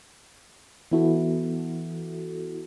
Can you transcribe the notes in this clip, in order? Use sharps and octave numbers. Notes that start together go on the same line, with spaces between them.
E3 B3 E4 F#4 A4